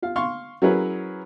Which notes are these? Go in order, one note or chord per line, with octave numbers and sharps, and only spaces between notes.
F4 F5
F5 C6 C#6 F6
F#3 C#4 E4 G#4 A#4 B4